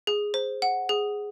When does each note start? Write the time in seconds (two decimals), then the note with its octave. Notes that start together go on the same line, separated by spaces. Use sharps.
0.07 G#4
0.34 C5
0.62 F#5
0.89 G#4